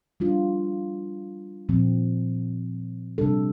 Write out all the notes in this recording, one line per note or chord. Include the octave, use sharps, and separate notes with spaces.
G3 D4 F4
A#2 F3 C4
C3 G3 D4 A4